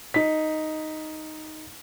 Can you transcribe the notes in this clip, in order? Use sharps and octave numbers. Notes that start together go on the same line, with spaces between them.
D#4 B6